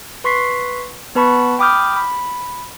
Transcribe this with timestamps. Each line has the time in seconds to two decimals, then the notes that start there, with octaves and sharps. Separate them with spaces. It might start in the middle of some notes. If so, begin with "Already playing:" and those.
0.24 B4 C6 C#6 B6 C7
1.15 B3 B4 A5 B5 C#6
1.59 G5 B5 D6 D#6 F6 G6
1.96 B5